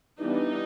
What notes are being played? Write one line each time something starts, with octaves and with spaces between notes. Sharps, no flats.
E3 G3 B3 D4 D#4